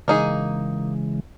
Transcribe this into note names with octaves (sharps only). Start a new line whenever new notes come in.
C#3 E3 G#3 A#3 D#4 G#4